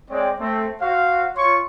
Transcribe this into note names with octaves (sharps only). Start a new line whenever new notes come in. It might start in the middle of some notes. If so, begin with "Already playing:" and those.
G#3 C4 C#5 D5 G5
A3 C4
F#4 C5 F5
F4 C#5 C6 C#6